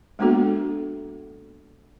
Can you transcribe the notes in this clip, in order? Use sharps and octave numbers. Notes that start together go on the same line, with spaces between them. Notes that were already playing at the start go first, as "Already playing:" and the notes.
G#3 A#3 B3 D4 F#4 A4